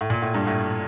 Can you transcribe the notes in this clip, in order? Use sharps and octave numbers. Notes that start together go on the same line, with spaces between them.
A2
A#2
A2
G2
A2